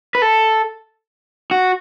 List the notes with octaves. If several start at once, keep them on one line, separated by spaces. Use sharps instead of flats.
B4
A4
F#4